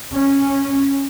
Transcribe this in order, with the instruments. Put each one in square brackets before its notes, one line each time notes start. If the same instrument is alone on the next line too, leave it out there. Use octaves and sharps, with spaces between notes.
[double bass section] C#4